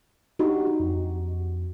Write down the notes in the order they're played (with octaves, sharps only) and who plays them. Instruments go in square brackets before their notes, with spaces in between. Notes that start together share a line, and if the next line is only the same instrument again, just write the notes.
[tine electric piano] D4 D#4 G4 [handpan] F#4
[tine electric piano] F2